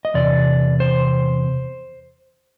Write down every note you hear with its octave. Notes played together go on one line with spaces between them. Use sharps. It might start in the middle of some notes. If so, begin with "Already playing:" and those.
D#5
E2 C3 D5
C5